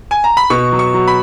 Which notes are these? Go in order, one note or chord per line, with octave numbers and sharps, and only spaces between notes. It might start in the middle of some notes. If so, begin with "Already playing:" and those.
G#5
A#5
B5
B2 C#6
F#3
C#6
F#3
B5